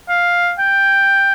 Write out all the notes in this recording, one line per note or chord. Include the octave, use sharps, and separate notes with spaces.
F5
G5